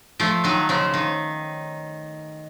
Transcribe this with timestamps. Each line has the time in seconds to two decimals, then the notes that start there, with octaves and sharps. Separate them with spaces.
0.20 F3 A3
0.44 D#3 F#3
0.69 C#3 F3
0.94 D#3